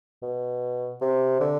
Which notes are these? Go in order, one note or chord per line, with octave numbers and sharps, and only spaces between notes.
B2
C3
D3